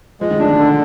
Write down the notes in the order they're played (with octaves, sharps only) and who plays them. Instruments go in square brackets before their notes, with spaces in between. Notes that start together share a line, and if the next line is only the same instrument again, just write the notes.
[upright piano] F3 [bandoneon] G#3
[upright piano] D#3
[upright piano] D3 [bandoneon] D4
[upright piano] D#3
[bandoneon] D3